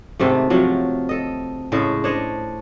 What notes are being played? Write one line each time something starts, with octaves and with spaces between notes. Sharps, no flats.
G#2 C3 D#3 A3
C3 F3 F#3
A4 D#5
A2 C#3 G#3 A4
D4 C5 C#5 D#5